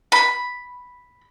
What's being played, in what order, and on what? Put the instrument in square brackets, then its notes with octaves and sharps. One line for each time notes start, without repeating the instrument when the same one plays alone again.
[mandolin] B5